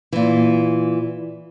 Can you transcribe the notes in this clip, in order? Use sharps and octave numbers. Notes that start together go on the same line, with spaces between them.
A#2 E3